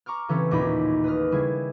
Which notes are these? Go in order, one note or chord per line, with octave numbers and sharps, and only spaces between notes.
A#5 C#6 D6 F6
C#3 E3 C4 C#4 G4 A4
A1 D#2 A#2 D#4 G#4 B5
B4 D#6 F6
C#3 G3 E4 G#4